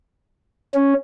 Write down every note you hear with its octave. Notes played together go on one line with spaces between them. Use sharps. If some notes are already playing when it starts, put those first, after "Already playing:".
C#4